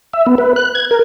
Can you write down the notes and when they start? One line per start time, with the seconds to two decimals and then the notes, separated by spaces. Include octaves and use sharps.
0.14 E5
0.27 B3
0.38 B4
0.56 F#6
0.75 G#6
0.91 A#4